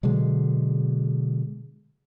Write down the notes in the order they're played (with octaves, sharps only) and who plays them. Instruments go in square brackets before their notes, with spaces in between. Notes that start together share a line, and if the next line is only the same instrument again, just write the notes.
[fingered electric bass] B2 D3 F#3 G#3